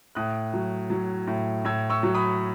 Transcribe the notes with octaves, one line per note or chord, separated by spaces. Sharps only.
A2 D#6 F#6
F#3
F#3
A2
A2 E6 G#6
C#6 E6
F#3
B5 D#6